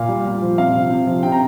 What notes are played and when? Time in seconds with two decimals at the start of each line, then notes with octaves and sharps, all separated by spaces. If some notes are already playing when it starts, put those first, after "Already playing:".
Already playing: A#2 F5
0.08 G3
0.26 A#2
0.42 F3
0.58 C3 F5
0.75 F3
0.90 C3
1.07 F3
1.23 C3 G5
1.32 A#5